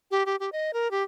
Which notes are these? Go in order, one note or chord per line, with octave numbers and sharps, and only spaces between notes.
G4
G4
G4
D#5
A#4
G4